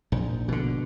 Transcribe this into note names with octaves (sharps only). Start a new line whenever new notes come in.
A#1 G#2
B2 D3